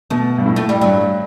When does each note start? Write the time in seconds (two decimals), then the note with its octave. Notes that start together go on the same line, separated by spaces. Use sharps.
0.10 B2 A3
0.38 G2
0.46 A2
0.56 A3
0.69 G3
0.81 G2 F#3